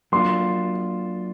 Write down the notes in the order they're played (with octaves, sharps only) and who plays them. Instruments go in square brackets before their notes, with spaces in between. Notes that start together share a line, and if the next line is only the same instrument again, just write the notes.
[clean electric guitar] F#3 A#3 D4 F4 [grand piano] C6